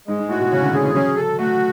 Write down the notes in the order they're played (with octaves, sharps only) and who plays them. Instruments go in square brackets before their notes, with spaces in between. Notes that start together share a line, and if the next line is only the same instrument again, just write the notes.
[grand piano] G#2 [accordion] G#3
[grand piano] G#2
[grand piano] A2 [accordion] F#4
[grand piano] B2
[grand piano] C#3 [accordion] C#4
[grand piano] D3
[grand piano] D3 [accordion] G#4
[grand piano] E3
[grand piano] F#3 [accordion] C#4
[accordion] A4
[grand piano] A3 [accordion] F#4